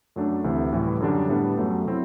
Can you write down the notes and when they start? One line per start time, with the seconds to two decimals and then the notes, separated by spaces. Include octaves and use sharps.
0.16 F#2 F#3 A3 D4
0.44 D2 C3 E3
0.73 A2 E3 G3
1.00 F#2 D3 G3 D4
1.29 A2 G3 B3 D4
1.57 F#2 F#3 A3
1.86 C3 F#3 C4 E4